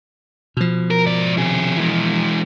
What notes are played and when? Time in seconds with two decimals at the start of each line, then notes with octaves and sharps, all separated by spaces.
0.57 B2 F3
0.91 A#4
1.06 G#2 D5
1.38 C3 G#4
1.77 E3 G#3